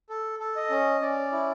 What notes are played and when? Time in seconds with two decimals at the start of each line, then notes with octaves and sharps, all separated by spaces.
0.10 A4
0.40 A4
0.56 D#5
0.70 C#4
1.01 C#4 D5
1.32 E4